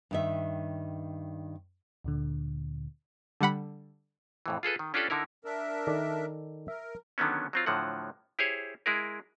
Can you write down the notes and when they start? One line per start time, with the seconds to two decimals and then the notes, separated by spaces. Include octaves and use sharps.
0.11 G2 D#3 E5
2.04 D2 A#2 D3
3.41 D3 G3 F#5 B5
4.46 F2 A2 E3
4.63 F4 G#4 A4 B4
4.79 D#3
4.94 C#4 D4 F4 G4 A4 D5
5.10 D3 D#4 E4 A#4
5.45 D4 A#4 E5
5.87 D#3 A4 D5
6.68 A#4 E5
7.18 D3 D#3 F#3 B3 C#4
7.53 F#3 C4 F4
7.66 A2 D3 F3 F#3 F#5
8.39 E4 G4 G#4 C5 C#5
8.86 G#3 E4 G#4 A#4